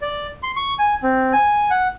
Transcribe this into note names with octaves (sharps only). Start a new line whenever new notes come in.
D5
C6
C#6
G#5
C4
G#5
F#5